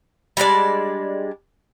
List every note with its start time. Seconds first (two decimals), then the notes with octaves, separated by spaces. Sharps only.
0.37 G3 G#3 D4 D5